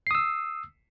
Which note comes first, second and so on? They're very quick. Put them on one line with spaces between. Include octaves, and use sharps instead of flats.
C7 D#6 E6